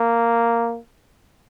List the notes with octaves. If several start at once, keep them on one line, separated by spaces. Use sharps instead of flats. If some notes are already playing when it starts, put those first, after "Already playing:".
Already playing: A#3